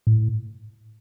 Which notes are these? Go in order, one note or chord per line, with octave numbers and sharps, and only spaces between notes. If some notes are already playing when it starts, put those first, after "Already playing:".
A2